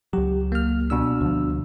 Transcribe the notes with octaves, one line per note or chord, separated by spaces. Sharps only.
C#2 F#3 G4
A#3 F6
B2 D4 E6
D2 F3